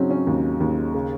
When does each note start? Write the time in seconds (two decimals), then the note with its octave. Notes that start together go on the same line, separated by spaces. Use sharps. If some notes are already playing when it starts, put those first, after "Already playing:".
Already playing: C#3 F#3 C4 C#4 D#4
0.10 C#4
0.27 D#2
0.60 D#2
0.94 C#3